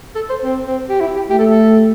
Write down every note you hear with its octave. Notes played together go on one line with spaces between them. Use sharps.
A4
C5
C4
C4
G4
E4
G4
A3 G4
A4
A4